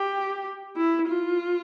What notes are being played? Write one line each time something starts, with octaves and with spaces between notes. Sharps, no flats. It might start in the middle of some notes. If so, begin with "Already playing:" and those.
Already playing: G4
E4
F4